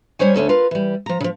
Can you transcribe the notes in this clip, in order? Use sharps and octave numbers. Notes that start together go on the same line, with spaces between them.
G3 C#4 C5 C#5 G#5
D2 C#4 A4 A5
F4 A#4 B4
E3 G3
F3 A#5
C#3 F3